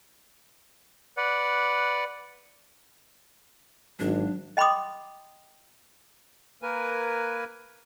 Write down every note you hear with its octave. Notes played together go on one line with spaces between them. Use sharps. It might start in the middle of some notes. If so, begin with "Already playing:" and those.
B4 D5 F#5
G#1 F#3 D4
D#5 G5 B5 C6 D6 D#6
A#3 A#4 B4 G#5